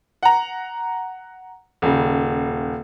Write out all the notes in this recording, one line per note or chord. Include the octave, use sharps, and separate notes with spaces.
F#5 A#5
D#1 C#3